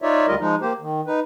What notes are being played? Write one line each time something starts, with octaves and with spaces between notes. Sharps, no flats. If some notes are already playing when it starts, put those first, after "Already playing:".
D#4 F4 C#5 D5 E5
D2 G3 F4 A#4 D#5
F3 G#3 D#4
A#3 G4 C5
D#3
D#4 B4